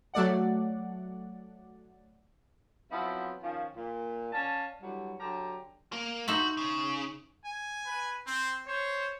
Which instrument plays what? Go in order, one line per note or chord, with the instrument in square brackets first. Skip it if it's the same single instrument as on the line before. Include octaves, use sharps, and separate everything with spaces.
[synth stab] F#3 A3 D5 F#5
[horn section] F3 F#3 B3 C4 E4 F4
D#3 F3 C#4
A#2
C#4 D5 F5 A5
D3 E3 F#3 G3
D3 F#3 G4 A5 A#5
[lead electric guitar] A#3
[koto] D#4 C5 E5 [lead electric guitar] F#4
[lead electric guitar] C#3
[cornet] G#5
[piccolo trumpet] B4
[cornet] C4 [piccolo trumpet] C5
[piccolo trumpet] C5 [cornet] C#5